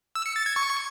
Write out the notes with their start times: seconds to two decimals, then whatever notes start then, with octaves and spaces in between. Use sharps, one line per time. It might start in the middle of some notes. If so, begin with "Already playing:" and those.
0.15 E6
0.26 C#7
0.36 A6
0.46 G#6
0.56 C#6